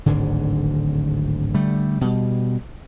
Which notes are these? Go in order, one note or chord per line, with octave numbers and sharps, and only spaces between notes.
D1 G#1 G#2 D3
D3 G3 A3
B2 G3